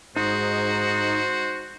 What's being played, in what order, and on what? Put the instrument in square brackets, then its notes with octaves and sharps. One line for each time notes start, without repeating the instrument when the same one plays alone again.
[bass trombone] G#2 [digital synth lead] D#4 [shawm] F#4 [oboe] C5